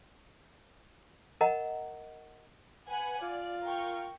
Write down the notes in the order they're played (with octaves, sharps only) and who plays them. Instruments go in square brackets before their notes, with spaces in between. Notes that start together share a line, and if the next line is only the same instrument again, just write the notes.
[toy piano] A#4 D#5 F#5 A#5
[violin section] B4 F#5 G#5
[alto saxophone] F4 [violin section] D5
[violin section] A#4 G5 C#6